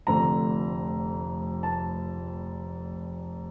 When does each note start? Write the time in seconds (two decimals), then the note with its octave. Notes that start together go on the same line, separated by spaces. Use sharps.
0.07 F1 F2 D3 A3 A#5
1.63 A5